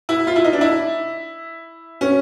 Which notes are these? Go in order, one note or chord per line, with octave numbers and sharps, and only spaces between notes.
E4
F4
E4
D#4
D4
E4
C#4